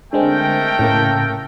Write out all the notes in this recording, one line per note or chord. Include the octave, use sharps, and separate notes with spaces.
D3 G#3 A3 C4 A#4 G5
A2 C#3 A#3